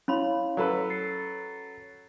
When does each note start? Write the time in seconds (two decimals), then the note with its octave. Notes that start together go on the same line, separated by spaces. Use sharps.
0.08 C#4 E4 C#5 F5 B5 C6
0.57 F#3 A4 B4
0.90 A6 C7 C#7